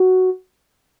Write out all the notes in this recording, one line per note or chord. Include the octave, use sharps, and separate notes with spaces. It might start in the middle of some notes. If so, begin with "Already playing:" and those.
Already playing: F#4